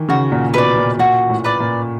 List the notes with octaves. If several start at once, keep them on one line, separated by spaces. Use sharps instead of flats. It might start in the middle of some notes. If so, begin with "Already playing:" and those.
Already playing: D#3 E3
C#3 F#4
A#2
B2 B4 D5
A#2
A#2 F#4
A2
B4 D5
A#2